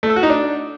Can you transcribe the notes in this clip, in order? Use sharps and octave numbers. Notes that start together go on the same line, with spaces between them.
A3
A4
F#4
D#4
D4